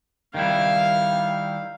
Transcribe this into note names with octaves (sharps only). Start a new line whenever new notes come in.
D#3 G3 E4 F5